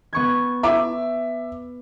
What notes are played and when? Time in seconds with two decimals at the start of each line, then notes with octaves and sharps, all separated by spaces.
0.13 B3 C#6 G#6
0.63 E5 D6